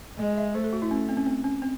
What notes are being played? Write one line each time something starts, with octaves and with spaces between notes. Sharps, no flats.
G#3 D#5
E5
A3 C5
A4
F#4
E4
C#4
C4
C#4
C4
C#4
C4